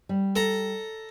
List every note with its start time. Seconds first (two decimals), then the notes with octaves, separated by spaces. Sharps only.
0.09 G3
0.36 A4 A#5